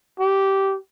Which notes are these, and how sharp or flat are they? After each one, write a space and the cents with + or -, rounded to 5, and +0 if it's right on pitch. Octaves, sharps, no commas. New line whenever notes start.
G4 -10